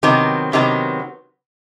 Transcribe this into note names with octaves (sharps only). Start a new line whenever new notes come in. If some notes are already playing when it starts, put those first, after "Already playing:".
C3 D#3 F#3 B3
C3 D#3 F#3 B3